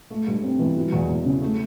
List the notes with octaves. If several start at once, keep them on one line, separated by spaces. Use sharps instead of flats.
A3
G2
C4
E3
F#3
E2
E2
C#3
A3